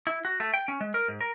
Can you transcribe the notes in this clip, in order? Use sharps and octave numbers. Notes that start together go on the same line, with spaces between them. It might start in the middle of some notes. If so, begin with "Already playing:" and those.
E4
F#4
A3
G5
C#4
G#3
A#4
G#2
A#4